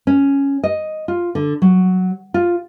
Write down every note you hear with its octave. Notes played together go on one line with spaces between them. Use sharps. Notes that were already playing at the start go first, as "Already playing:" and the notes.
C#4
D#5
F4
D3
F#3
F4